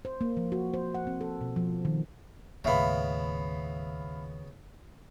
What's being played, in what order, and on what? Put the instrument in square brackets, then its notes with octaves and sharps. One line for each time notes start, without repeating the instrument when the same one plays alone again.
[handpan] C5
A#3
F3
F#4
C5
F#5
C4
A4
B2
F3
D#3
[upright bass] D#2 A2 [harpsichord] C#3 B3 [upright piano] E5 F5 B5